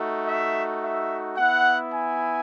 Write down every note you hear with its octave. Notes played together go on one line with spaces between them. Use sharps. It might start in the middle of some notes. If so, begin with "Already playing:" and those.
Already playing: A3 D#4 F#4
E5
E5
B3 E4 F#5
G#5